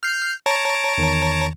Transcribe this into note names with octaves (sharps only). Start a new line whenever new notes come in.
F6 G6 C7
C#5 A5 A#5 D7
E2 D#3